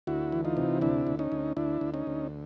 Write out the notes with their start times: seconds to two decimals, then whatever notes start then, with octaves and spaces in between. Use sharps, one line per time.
0.07 D2 E4 F#4
0.32 E3
0.45 D#4 F4
0.57 C3
0.81 D2 D4 E4
1.07 D2
1.19 C#4 D#4
1.32 D2
1.56 D2 D4 E4
1.81 D2
1.94 C#4 D#4
2.07 D2